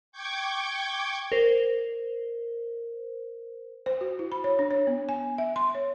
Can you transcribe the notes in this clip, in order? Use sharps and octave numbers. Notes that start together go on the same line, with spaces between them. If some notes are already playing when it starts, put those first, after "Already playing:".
G5 C#6 D6 G6 G#6
A#4 C5
C5
F#4
E4
B5
C#5
D4
C#5
B3
G#5
E5
C6
C#5